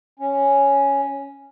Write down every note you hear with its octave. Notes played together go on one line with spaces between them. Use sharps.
C#4